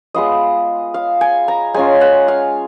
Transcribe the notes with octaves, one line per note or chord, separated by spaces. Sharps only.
G#3 B3 F4 D#5
F5
G#5
A#5
G#3 C#4 F4 G#5
F#5
F5